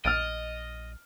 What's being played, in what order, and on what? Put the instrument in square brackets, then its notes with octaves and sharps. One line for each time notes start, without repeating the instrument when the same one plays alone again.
[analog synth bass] A#1 [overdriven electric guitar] D#5 [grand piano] F6 A6 D7